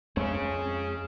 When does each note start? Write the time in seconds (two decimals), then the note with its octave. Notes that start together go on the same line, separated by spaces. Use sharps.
0.17 F2 G#3 C4 G#4 C#5